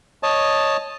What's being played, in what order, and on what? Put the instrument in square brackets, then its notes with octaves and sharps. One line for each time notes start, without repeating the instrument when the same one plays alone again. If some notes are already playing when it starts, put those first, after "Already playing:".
[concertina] C#5 D#5 A5